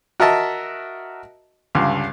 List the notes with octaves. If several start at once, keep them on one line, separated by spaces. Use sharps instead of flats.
F#4 A#4 D#5 E5 A5
C#2 G2 D3